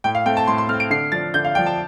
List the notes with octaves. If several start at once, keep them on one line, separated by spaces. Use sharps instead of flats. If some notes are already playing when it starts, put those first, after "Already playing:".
A2 G5
F5
A3 C4 G5
A5
A2 C6
C6
A3 C4 F6
D7
D3 C7
F3 D4 A6
D3 G6
F5
F3 D4 G5
A5